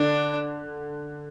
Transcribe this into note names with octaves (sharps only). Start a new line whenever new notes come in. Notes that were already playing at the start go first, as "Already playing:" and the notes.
Already playing: D3 D4